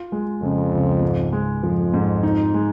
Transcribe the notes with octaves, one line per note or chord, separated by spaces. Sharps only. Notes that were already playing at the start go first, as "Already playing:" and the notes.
Already playing: F4
G#3
F2 C#3
C#2
G#2
G#3
F2 F3
G#2
D#4
G#3